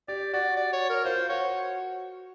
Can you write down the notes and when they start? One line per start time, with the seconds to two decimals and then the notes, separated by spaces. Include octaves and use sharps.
0.08 G4 D5
0.33 F#4 D5
0.56 D5
0.73 C#5
0.90 A#4
1.05 F4 C5
1.29 F#4 C#5